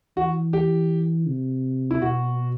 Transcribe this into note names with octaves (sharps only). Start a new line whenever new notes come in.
E3 F#4
G4
C3
E4
B2 F#4